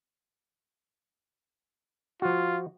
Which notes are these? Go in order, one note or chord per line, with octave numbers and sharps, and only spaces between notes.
F3 F4 F#4